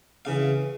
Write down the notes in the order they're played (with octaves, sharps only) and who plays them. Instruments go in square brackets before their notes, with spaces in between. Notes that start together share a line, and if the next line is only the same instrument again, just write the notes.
[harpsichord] C#3 E3 F5